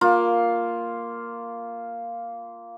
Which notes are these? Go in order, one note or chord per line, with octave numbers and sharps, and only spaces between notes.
A#3 F4